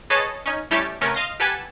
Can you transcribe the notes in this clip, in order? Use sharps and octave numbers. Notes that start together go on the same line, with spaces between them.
G#4 A4 B4 C#5 D#5 A5
C#4 D#4
G3 A3 C#4 E4 G4 A4
C3 A3 B3 C#4 A#4
D#5 F5 C6 A#6
G4 A4 B4 F#5 G#5 E6